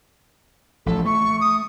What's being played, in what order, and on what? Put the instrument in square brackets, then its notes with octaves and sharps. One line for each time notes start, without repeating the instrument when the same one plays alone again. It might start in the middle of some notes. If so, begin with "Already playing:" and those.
[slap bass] A1 F3 A3 [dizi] A4
[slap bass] A3 [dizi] C#6
[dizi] D#6